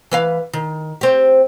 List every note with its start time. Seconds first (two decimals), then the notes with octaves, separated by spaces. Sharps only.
0.11 E3 B4 F5
0.53 D#3
1.01 C4 G4